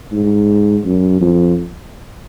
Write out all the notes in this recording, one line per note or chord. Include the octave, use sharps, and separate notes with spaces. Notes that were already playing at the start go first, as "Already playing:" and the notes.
G#2
F#2
F2